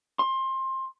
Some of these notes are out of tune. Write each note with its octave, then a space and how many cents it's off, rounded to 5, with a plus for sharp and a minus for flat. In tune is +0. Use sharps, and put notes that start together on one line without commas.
C6 +20